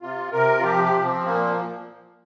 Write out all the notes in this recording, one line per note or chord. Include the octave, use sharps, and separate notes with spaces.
C3 F4
C3 A#4
F4
F3 G4
G4
F3
C4
A#2 A#3